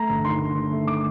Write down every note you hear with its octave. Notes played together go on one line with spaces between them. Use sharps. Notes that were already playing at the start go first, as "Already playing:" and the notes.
Already playing: A3 A#5
G1
D#3 C6
D#3
A3
A3
D6